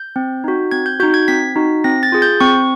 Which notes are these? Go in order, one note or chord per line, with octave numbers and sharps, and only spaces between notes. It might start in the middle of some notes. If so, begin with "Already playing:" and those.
Already playing: G6
C4
D#4 F#4
C4 G#6
G6
D#4 F#4 G6
G#6
C4 B6
D#4 F#4
C4 A#6
A6
F4 G#4
G6
C4 C#6